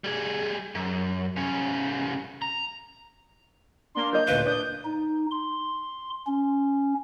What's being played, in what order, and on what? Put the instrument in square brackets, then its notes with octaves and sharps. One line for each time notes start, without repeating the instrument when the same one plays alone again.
[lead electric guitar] G3 G#4
F#2
C2 C#4
A#5
[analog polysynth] A#3 D4 [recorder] C6
[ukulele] A#4 D#5 [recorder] G6
[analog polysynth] A1 D2 A#2 [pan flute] B4 [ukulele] F5
[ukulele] D4 D5 [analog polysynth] D#6 [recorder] G6
[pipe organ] D#4
C6
C#4